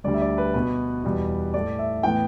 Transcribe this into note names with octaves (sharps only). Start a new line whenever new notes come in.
D2 D3 G3 D5
E5
D5
B4
B2 B3 B4
E2 B2 G3
A2 A3 D5
E5
A2 E3 B3 G5